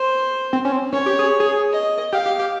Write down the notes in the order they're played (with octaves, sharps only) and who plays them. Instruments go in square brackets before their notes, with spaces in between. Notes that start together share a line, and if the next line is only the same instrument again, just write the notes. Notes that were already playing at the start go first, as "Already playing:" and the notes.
Already playing: [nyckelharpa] C5
[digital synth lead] C4
C#4
C4
[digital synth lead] C#4 [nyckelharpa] C#5
[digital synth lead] G4
G#4
G#4
[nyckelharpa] D#5
[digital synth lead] G4 [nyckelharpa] F5
[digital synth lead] G4
G4